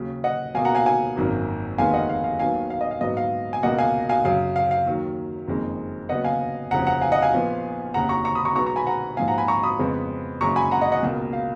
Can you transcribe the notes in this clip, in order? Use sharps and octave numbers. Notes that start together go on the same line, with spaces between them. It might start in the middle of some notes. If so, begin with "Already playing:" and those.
Already playing: D#2 C#3 F#3
D#5 F#5
C#2 B2 A#3 F5 G#5
F#5 A#5
F5 G#5
F5 G#5
G#1 F#2 D#3 A#3
F1 D#2 D#3 G#3 B3 F5 G#5
D#5 F#5
F5
F5
D#2 D#3 F#3 B3 F5 G#5
F5
D#5
F5
A#1 G#2 F#3 B3 D#5
F5
G#5
C#2 B2 A#3 D#5 F#5
F5 G#5
F5 G#5
F#2 C#3 F#3 F5
F5
F5
D#2 D#3 F#3
F#1 F2 D#3 G#3
D#2 C#3 F#3 B3 D#5 F#5
F5 G#5
F1 D#2 C#3 F3 F#5 A#5
F#5 A#5
F5 G#5
D#5 F#5
F5 G#5
A#1 A#2 F3 B3
F1 D#2 C#3 F#5 A#5
A#5 C#6
A#5 C#6
B5 D#6
A#5 C#6
B1 B2 G#3 B3 A#5 C#6
A#5 C#6
G#5 B5
F#5 A#5
A#1 G#2 F3 F5 G#5
F#5 A#5
G#5 B5
A#5 C#6
B5 D#6
F2 C#3 G#3 B3
F#1 F#2 C#3 G#3 A#5 C#6
G#5 B5
F#5 A#5
D#5 F#5
D#5 F#5
C#2 B2 A#3
F5